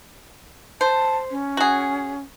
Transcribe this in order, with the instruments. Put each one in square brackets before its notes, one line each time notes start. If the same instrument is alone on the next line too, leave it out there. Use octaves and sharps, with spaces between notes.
[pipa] C5 [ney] A5
[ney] C#4
[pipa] F#4 G#4